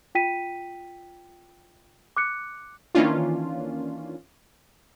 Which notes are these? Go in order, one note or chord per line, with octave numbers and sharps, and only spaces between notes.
F4 G5 B6 D#7
D6 F#6 C#7
D#3 E3 A#3 C#4 D4 F4